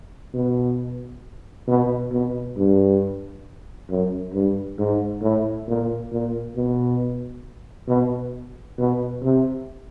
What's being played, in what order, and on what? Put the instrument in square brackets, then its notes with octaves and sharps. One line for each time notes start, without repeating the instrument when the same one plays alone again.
[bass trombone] B2
B2
B2
G2
F#2
G2
G#2
A2
A#2
A#2
B2
B2
B2
C3